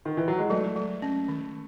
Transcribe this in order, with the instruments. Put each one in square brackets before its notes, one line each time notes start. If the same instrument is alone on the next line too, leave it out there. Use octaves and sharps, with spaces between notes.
[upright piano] D#3
E3
F#3
G#3
[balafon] F#3 [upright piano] A3
[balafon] F#3
C#4
D#3